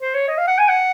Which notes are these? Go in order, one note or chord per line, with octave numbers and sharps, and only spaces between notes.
C5
C#5
D#5
F5
F#5
G#5
F#5